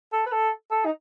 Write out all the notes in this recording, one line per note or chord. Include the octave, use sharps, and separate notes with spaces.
A4
B4
A4
A4
D#4